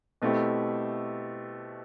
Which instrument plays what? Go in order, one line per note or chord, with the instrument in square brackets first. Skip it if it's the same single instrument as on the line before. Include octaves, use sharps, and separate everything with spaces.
[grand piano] B2 A3 C4 E4 G4